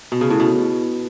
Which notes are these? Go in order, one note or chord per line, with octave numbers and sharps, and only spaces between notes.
B2
C#3
A2
B2